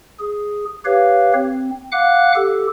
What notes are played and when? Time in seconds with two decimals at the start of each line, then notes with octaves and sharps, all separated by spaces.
0.19 G#4
0.85 G4 B4 C#5 F5
1.33 C4
1.92 F5 F#5 D6 F#6
2.35 G4 A4